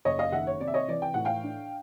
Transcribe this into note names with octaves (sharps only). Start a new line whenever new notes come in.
F#1 C#5 D#5
D#5 F5
D#3 E5 F#5
C#5
C3 D5
E5
C#5 D#5
E3 D5
G5
A2 F#5
F5 G5
D4